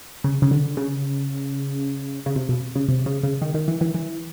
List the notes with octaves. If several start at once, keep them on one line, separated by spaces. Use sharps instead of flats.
C#3
C#3
D3
C#3
C#3
C3
B2
C#3
C3
C#3
C#3
D#3
D#3
E3
E3
E3